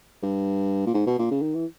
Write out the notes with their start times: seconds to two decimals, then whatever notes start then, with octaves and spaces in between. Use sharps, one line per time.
0.23 G2
0.86 A#2
0.94 G#2
1.06 B2
1.19 A#2
1.31 C#3
1.42 D#3
1.54 E3